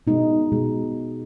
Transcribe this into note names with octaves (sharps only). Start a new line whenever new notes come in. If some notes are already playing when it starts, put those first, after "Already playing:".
B2 G#3 D#4
B2 G#3